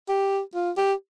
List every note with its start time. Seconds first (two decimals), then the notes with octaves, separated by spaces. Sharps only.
0.09 G4
0.55 F4
0.77 G4